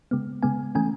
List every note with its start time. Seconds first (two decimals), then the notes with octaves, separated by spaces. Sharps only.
0.11 C#3 G#3 B3
0.43 C#3 G#3 B3 G#5
0.75 E3 A3 C#4 G#5